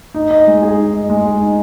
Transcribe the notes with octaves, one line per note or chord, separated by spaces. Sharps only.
D#4
D#5
G#3
G#4
D#4
D#5
G#3
G#4
D#4